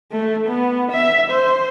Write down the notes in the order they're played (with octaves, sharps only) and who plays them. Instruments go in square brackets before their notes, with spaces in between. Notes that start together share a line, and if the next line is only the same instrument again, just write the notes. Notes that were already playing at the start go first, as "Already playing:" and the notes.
[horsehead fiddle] A3
B3
E5
C5